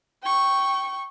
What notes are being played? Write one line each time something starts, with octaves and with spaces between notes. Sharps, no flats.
G5 C#6